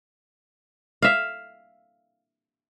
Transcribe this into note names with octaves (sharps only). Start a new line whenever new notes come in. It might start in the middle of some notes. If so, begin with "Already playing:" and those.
E5 F5